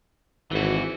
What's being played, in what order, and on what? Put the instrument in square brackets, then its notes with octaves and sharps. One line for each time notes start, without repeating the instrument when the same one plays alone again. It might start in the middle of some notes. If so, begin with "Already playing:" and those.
[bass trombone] G#1 [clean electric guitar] E3 F#4